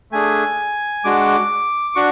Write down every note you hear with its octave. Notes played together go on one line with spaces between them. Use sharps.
A3 D4 G#4 G#5
G#3 D4 F#4 D6
D4 F#4 C#6